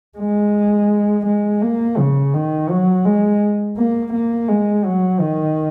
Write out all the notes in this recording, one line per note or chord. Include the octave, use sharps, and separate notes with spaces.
G#3
G#3
A#3
C#3
D#3
F#3
G#3
A#3
A#3
G#3
F#3
D#3